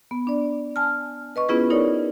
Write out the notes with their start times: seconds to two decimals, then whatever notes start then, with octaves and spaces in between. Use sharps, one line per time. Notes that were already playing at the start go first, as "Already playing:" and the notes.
0.11 B3
0.27 D4 D5
0.76 G#5 A5 F6
1.36 B4 D#5 C#6
1.49 B3 C#4 E4 F4 G#4 B4
1.70 D#4 E4 A#4 C#5 D5